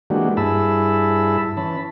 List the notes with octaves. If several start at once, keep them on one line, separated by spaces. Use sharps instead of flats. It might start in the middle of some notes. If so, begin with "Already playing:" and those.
E3 G#3 A#3 D4 F#4 G4
G2 E4 G#4 A5 B5 E6
E3 C#4 A5 B5